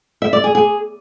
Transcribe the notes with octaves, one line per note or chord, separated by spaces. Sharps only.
E5
D5
G#4
G#4